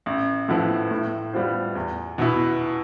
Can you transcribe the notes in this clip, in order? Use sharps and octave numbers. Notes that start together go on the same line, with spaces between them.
A1
A2 F3 B3 E4
A2
G3 B3 F4 C5
E2
B2 B3 E4